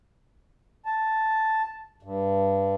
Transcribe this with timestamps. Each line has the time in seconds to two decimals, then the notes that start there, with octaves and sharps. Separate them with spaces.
0.85 A5
2.03 G2